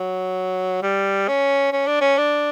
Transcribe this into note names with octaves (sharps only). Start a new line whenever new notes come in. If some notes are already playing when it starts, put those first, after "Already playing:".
Already playing: F#3
G3
C#4
C#4
D4
C#4
D4